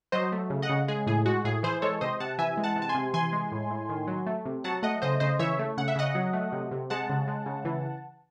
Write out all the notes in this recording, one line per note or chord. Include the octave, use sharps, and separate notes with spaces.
F#3 C5 D#5
A3
C#3
D#5 F#5
C#3
G#3 G#4
A2 G#4
G#3 F#4
A2 G#4
E3 G#4 C5
G#3 A4 C#5
C3 C5 D#5
C3 F#5 A5
E3 E5 G#5
G#3
F#5 A5
C3
A5
G#5 C6
C3
E3 G#5 C6
G#3
A2
A2
D#3
F#3
A3
C3
F#3 F#5 A5
A3 D#5 F#5
C#3 C5 D#5
C#3 C5 D#5
E3 C#5 E5
A3
C#3 F#5
E5
C#3 D#5 F#5
F#3
A3
C3
C3
G#3 F#5 A5
C#3
G#3
C#3
E3